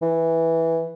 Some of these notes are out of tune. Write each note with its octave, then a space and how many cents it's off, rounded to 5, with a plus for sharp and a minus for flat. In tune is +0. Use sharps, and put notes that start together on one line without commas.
E3 -5